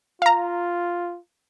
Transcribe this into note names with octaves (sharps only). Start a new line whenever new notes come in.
F4 F5 A#5